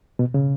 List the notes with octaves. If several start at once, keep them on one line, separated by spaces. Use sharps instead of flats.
B2
C#3